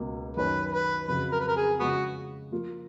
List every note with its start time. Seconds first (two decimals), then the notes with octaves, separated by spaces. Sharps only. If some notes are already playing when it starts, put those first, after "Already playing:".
Already playing: C#2 B2 A#3
0.37 F#2 D#3 F#3 C#4 B4
0.73 B4
1.08 F2 C#3 F#3 B4
1.32 A#4
1.40 B4
1.48 A#4
1.57 G#4
1.79 C#3 F3 G#3 B3 F#4
2.51 F3 A#3 F4